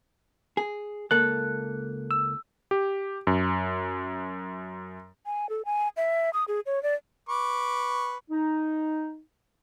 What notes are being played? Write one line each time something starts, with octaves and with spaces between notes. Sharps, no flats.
G#4
C#2 A#3 A4 F#6
E6
G4
F#2
G#5
A4
G#5
E5
D#6
G#4
C#5
D5
B4 C#6 D6
D#4